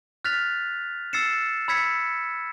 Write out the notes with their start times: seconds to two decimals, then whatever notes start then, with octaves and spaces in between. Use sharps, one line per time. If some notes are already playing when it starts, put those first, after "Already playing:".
0.24 F6 F#6 A6 B6 F7
1.13 E6 A6 C7 C#7 E7
1.68 B5 E6 G#6 B6 C#7